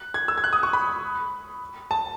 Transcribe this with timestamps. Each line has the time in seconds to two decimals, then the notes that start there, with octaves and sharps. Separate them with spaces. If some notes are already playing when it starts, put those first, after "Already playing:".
Already playing: F#6
0.14 G#6
0.28 E6
0.38 G#6
0.44 F#6
0.53 D#6
0.63 C#6
0.73 B5
1.91 A5